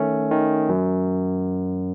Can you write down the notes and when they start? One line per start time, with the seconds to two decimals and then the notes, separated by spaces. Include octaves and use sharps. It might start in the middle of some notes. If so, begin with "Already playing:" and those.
Already playing: D#3 A3 C#4
0.31 D#3
0.69 F#2